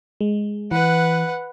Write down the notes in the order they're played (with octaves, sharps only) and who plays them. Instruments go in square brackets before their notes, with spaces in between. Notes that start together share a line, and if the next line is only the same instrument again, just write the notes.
[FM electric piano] G#3
[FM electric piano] E3 [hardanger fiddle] B4 F#5